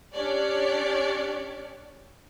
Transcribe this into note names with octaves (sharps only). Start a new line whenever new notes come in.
C#4 D4 G4 C#5 D5